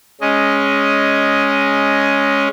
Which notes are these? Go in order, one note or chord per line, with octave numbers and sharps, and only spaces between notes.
G#3 C#4 D#5